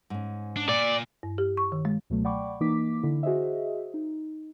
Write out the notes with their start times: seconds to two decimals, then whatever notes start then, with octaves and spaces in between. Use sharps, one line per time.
0.10 G#2 C#4
0.56 D4
0.69 A#2 D5
1.23 G2
1.38 G4
1.57 C#6
1.72 D#3
1.85 G#3
2.10 C#2 B2 F#3 A3
2.24 D5 F#5 G5 B5 C#6 D6
2.60 E3 A#3 D#4 D6 B6
3.03 D3 E4
3.23 F#4 G#4 C5 D#5 E5
3.94 D#4